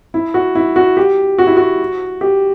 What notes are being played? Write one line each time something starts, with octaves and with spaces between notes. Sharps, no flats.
E4
F#4
E4
F#4
G4
F#4
E4
F#4
G4